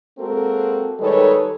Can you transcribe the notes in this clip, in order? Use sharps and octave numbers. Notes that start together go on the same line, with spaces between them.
G#3 A#3 C4 F#4 A4 A#4
D#3 G3 G#3 A4 B4 C#5